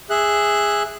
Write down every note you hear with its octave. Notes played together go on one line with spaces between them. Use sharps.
G#4 E5 F#6